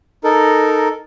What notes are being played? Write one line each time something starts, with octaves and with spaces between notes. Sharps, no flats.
D#4 A4 A#4